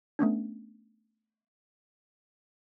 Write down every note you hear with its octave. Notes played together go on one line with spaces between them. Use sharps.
A3 B3 C#4 D4